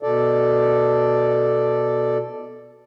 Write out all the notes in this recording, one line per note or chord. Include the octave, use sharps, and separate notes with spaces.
B2 A4 D5